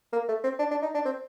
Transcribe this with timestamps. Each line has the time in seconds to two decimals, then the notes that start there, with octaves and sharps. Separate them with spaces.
0.13 A#3
0.29 A3
0.44 C4
0.59 D4
0.71 D4
0.82 D#4
0.94 D4
1.05 C4